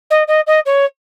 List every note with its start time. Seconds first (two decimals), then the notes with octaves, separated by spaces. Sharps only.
0.10 D#5
0.28 D#5
0.47 D#5
0.65 C#5